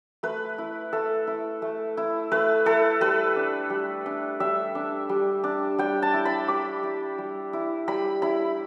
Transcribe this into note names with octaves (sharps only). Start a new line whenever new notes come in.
A3 B4
E4
A3 A4
E4
A3
E4
A3 B4
E4 A4
G3 B4
D4
G3
D4
G3 E5
D4
G3
D4
G3 G5
A5
E4
B5
G3 D6
E4
G3
E4
G3 B5
E4 B5